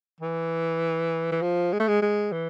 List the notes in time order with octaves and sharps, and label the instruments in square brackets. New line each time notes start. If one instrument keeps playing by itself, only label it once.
[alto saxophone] E3
E3
F3
G#3
A3
G#3
G#3
E3